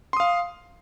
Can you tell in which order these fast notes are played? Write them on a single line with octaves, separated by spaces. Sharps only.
C6 D#6 F5